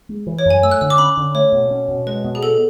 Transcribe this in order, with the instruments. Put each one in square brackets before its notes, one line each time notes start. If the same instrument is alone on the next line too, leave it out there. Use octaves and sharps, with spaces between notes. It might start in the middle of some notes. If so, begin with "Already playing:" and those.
[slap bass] G#3
E3
[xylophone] C#5
[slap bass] F#2
[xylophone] G#5
[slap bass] A3 [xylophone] E6
[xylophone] F#6
[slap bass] D3 [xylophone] E6
[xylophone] D6
[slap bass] C#4 [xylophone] B5
[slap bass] D3
[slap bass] A3 [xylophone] C#5
[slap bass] B2
C#4
B2
[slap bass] G#3 [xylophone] B4
[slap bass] B2
[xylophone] G#4
[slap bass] B3 [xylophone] A4